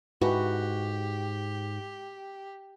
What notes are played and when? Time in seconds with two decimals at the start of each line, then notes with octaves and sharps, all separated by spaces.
0.22 G#2 E4 F#4 G4 B4